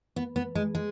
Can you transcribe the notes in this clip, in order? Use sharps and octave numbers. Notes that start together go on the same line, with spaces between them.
B3
B3
G#3
G#3